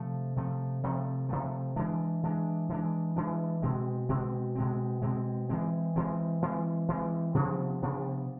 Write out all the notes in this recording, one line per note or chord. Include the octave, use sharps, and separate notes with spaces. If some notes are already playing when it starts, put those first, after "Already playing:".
Already playing: C3 F3 A3
C3 F3 A3
C3 F3 A3
C3 F3 A3
E3 G#3 D4
E3 G#3 D4
E3 G#3 D4
E3 G#3 D4
B2 G#3 C4
B2 G#3 C4
B2 G#3 C4
B2 G#3 C4
E3 G#3 C4
E3 G#3 C4
E3 G#3 C4
E3 G#3 C4
C3 F3 B3 D4
C3 F3 B3 D4